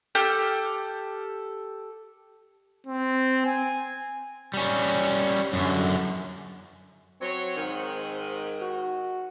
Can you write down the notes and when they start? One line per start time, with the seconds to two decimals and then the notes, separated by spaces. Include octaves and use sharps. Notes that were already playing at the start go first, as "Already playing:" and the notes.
0.15 G4 A4 F6
2.87 C4
3.46 G#5
4.54 G3 C#4
5.53 F#2 D3
7.21 F#3 C4 C#5
7.56 G#2 D#3
8.61 F#4